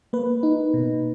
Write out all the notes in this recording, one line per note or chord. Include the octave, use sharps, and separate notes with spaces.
A#3 B4
D#4
B2